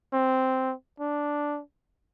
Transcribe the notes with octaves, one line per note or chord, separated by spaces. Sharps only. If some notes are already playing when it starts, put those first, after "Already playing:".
C4
D4